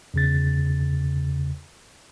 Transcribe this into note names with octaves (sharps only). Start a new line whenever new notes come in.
E2 C#3 A6